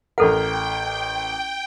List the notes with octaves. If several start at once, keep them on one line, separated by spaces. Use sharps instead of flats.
A1 A4 A#4 F#5 G5